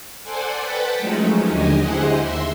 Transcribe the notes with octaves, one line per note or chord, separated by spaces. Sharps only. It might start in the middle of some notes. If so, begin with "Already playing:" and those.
A4 C5 D5 F#5 G#5
B4 F#5 G5 A5 B5
F3 F#3 G#3 A3 C#4 D#4
D#2 D3 G4 D#5 G#5
E4 G4 G#4 C5 D#5 F#5
D#2 E5 C6